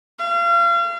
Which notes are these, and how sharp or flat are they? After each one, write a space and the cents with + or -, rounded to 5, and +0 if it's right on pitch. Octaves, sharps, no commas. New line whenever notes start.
F5 -35